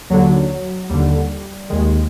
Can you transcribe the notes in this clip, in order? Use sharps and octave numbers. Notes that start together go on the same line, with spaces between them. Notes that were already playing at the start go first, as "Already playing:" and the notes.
D#2 D3 F#3
D#2 D3 G3
D#2 D#3 G#3